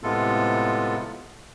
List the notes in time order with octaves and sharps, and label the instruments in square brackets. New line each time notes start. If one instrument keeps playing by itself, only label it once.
[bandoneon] A2 C3 G#3 B3 F4 A4